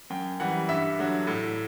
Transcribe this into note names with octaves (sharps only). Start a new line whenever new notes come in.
F#2 G5
E3 G3 F#5
G2 E5
D3 F#3
A2